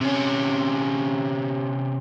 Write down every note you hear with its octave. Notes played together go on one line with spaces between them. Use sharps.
C3 C#4